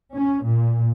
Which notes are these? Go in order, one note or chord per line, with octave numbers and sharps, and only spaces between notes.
C#4
A#2